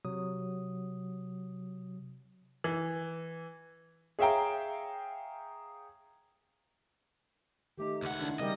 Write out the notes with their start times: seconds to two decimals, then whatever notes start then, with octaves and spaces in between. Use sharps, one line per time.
0.05 C3 F#3 D#6
2.64 E3
4.19 G#4 C#5 E5 F5 G5 A#5
7.78 D#3 A3 D#4 G4
8.02 C#2 F#5
8.20 D#3 D4 E4
8.40 C#3 G3 C4 A#4 D#5